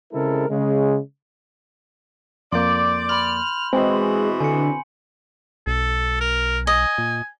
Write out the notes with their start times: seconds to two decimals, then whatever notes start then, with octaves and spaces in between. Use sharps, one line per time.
0.13 C#3 G#3 C4 E4 A4 A#4
0.50 C#3 G#3
2.52 F2 A#3 D5 C6 G6
3.09 B5 C6 F6 F#7
3.73 B2 E3 G#3 C4
4.40 D3 G#5 C#7
5.67 B1 A4
6.21 A#4
6.67 D#5 G#5
6.98 A#2